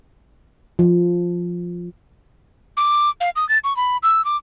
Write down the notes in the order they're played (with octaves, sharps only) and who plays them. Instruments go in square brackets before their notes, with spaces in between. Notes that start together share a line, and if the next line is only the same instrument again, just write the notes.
[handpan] F3
[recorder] D6
F5
D#6
A6
C#6
B5
E6
D6